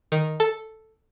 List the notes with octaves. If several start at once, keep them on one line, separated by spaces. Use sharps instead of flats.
D#3
A4